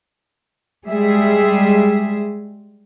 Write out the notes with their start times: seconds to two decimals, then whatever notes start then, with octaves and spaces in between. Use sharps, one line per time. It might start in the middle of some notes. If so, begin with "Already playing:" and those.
0.87 G3 G#3 G#4 E5